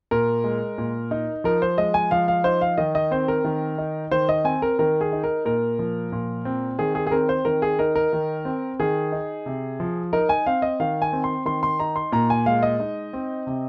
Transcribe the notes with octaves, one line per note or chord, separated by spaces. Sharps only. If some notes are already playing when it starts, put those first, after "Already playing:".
A#2 A#4
G#3
A#2
D#4
F3 A#4
C5
G#3 D#5
G#5
F3 F5
F5
D#4 C5
F5
D#3 D#5
D#5
C4 C5
A#4
D#3
D#4
D#3 C5
D#5
C4 G#5
A#4
D#3 A#4
G#4
D#4
A#4
A#2 A#4
F3
A#2
C4
D#3 G#4
G#4
G#4
C4 A#4
C5
D#3 A#4
G#4
D#4 A#4
A#4
D#3
C4
D#3 G#4
D#4
C3
F3
D#4 A#4
G#5
C4 F5
D#5
D#3 F5
G#5
C4
C6
D#3 C6
C6
D#4 A#5
C6
A#2 A#5
G#5
G#3 F5
D#5
D#4
C4
C3